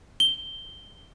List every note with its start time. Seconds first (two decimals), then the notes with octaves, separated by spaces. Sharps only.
0.20 G7